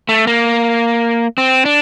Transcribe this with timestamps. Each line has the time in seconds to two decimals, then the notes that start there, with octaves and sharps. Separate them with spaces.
0.09 A3
0.27 A#3
1.38 C4
1.65 D4